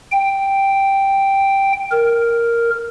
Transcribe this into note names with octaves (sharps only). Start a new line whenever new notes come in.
G5
A#4